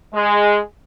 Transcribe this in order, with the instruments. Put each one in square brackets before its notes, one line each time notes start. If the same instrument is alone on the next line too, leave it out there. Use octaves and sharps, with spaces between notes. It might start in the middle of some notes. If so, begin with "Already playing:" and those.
[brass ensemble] G#3